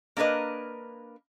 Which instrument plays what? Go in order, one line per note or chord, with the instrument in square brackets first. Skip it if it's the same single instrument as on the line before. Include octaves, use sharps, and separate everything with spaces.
[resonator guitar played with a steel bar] A#3 D4 A#4 B4 D#5